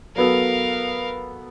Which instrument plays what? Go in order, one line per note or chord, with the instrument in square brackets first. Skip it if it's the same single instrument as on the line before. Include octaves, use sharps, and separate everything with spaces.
[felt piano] F#3 B3 A4 [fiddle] A#4 F5